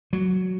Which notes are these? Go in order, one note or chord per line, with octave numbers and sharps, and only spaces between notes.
F#3